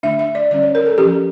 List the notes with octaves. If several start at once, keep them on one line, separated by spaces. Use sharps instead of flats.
D3 A3 D4 E5
E5
D5
D3 G3 C#4 D5
C#5
A#4
A4
F3 C#4 G4